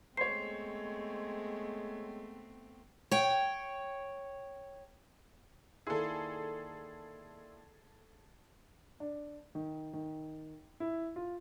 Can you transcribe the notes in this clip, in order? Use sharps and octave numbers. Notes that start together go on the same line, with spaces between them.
G#3 A3 B3 C4 C5 C#5 C7
C#5 G5
D#3 A#3 E4 G#4 A4 D5 C6 E6
D4
D#3
D#3
E4
F4